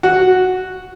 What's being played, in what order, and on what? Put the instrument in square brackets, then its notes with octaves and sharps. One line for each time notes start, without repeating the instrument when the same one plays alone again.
[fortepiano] F#4